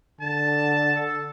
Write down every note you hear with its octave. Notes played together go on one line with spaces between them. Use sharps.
D3 A5
A4